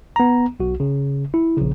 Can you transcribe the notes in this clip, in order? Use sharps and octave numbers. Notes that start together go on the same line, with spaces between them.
B3 A#5
B1 F#4
C#3
E4
A#1 C#3